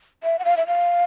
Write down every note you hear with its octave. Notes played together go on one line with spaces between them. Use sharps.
E5
F#5
F5
E5
F5